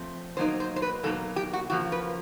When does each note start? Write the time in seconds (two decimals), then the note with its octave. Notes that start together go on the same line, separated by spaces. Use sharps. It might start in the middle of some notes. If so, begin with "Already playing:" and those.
Already playing: F3 A3 C4
0.37 B2 F#3 A#3 D#4 C5
0.60 C5
0.76 C5
0.82 B4
1.03 B2 F#3 A#3 D#4 A4
1.36 G4
1.53 F#4
1.70 C#3 F3 A#3 F#4
1.92 B4